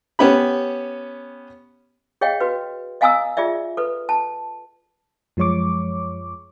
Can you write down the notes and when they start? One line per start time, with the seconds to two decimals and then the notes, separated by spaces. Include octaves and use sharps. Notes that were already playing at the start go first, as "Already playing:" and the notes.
0.19 B3 C#4 G4 B5
2.21 G#4 C#5 D#5 F5 G5
2.41 F#4 B4
3.01 D#5 F5 G#5 A#5 D#6 E6
3.37 F4 G#4 D5 E5
3.77 A4 B4
4.09 A5
5.37 F#2 F3 G#3 C#5 C#6 D6